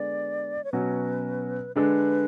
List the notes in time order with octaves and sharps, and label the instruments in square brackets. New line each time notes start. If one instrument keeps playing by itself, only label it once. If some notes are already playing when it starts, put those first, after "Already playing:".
Already playing: [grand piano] D3 G#3 B3 [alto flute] D5
[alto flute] C#5
[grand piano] B2 F#3 C#4 F#4 [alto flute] B4
[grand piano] D3 G#3 D4 A4 [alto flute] B4